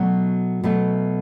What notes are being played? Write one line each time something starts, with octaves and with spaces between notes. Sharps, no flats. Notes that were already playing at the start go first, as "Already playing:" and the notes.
Already playing: B2 F#3 A3
B2 F#3 A3